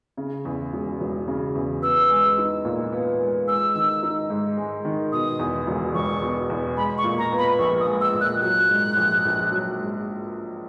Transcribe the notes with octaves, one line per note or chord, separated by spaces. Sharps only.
C#3
E2
E1
E1
C#3
E2
B3 E6
G#3
D#4
A#2
B3
G#3
G#3 E6
D#3
D#4
G#2
G#3
D#3
B2 D#6
E2
E1
E1 C#6
B2
E2
G#3 B5
C#6
A#2
A#5
B3
B5
A#1 C#6
D#6
G#3
E6
A#2
F#6
F#3 F#6
G#2
A#1
A#1
F#3
G#2